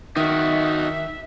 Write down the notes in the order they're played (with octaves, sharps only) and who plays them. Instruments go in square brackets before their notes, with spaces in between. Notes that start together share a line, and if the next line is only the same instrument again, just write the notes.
[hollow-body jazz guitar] D#3 [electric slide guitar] D#4 F#4 [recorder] E5